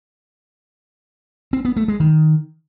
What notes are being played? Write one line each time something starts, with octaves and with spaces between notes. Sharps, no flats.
C4
B3
A3
G#3
D#3